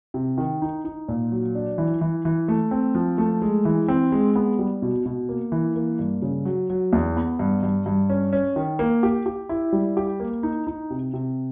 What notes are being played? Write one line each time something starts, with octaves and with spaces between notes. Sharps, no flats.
C3
D#3
D#4
D#4
A#2
F#3
D4
E3
E3
E3
A3
C4
F3
A3
G#3
E3
C4
G#3
B3
G3
B2
B2
A#3
E3
A#3
G2
C#3
F#3
F#3
E2
B3
G2
G2
G2
C#4
C#4
D#3
A#3
G4
G4
E4
G3
G4
A#3
D#4
D#4
C3
C3